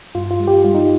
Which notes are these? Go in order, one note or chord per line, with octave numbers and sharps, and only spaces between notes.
G2 F4
F4
G3
G4
G3 F4
D#4